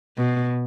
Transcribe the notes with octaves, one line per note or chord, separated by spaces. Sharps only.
B2